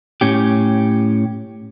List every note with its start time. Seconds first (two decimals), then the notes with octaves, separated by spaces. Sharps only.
0.21 A2 C#4 G4